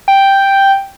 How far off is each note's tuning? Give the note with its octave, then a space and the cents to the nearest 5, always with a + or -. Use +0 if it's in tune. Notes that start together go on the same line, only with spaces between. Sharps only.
G5 +0